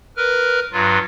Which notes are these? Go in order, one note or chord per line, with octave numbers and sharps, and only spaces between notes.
A#4 B4 F6
G2 F#3 F4